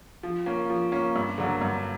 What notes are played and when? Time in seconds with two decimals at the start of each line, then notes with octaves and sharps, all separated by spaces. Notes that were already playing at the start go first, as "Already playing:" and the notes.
0.23 F3
0.46 A#3 C#4
0.70 F3
0.92 A#3 C#4
1.16 G2
1.38 D3 F#3 A#3
1.61 G2